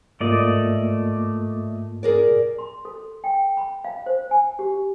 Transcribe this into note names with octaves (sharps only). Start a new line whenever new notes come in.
G#2 A3 A#3 F4 D5 D#5
G#4 A#4 D5
C6
A4
G5
B5
F5
C5
G#5
G4